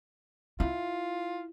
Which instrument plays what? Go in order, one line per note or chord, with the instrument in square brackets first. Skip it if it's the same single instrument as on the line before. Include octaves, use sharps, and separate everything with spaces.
[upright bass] E4 [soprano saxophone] F4